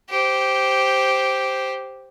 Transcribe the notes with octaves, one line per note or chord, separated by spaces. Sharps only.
G4 C5